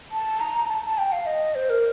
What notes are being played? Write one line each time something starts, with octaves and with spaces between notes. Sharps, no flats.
A5
A#5
A5
A5
G5
F5
D#5
C5
A#4